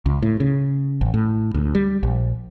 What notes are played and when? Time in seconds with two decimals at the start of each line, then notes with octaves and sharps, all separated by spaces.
0.06 C#2
0.22 A2
0.40 C#3
1.01 A1
1.14 A2
1.54 D2
1.75 G3
2.03 A#1